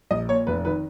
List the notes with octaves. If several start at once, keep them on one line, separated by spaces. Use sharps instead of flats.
A#1 D#5
A#2 C#5
F1 B4
D#3 B4